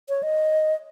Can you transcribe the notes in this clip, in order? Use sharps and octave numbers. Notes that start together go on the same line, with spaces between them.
C#5
D#5